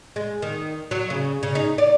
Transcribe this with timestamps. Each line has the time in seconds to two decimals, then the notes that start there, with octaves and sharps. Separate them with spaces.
0.16 G#3
0.42 D#3
0.91 F#3
1.10 C#3
1.43 C#3
1.55 D#4
1.78 D5